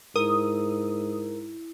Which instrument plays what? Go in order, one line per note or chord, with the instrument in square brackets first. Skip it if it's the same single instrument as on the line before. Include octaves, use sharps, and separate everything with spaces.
[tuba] G#2 [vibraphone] E4 [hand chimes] A#4 [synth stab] D#6